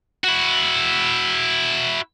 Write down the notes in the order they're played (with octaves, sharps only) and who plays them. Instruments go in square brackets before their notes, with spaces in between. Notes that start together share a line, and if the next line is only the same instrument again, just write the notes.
[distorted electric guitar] E4 F#4